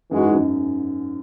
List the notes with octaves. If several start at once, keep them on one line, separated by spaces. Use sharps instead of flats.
F#2 E3 G#3 D#4 F#4
G#2
F#2